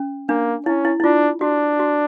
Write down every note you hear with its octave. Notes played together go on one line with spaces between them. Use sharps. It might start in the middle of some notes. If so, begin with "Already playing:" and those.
Already playing: C#4
A#3 D4
C#4 E4
E4
E4
D4 F4
D4 F#4
F#4